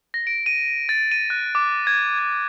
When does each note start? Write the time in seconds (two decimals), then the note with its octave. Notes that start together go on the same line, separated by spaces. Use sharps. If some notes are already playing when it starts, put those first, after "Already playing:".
0.14 A#6
0.27 D7
0.46 D#7
0.89 A6
1.12 D#7
1.30 F#6
1.55 D6
1.87 G#6
2.19 G#6